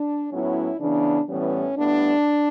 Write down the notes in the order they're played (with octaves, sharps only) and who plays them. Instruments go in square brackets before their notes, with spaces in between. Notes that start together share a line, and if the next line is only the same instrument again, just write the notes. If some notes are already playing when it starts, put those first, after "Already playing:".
Already playing: [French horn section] D4
A2 F#3 B3 C#4 E4
C#3 E3 B3 D4
A2 E3 G3 B3 C#4
A2 G3 B3 D4